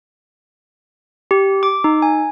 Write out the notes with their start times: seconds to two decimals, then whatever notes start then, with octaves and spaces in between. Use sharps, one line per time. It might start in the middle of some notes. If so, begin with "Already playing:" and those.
1.31 G4
1.63 D6
1.84 D#4
2.02 G#5